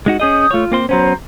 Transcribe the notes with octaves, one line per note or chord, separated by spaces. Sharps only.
G#3 D#4 F#4
C#4 G#4 D#5 D#6 G6
A3 F4 C#5
A#3 C4 C5
F#3 B3 C#4 C5 A#5